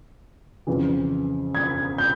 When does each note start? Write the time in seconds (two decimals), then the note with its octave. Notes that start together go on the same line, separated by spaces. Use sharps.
0.67 F2 C#3 E3
1.55 G#6
1.98 G6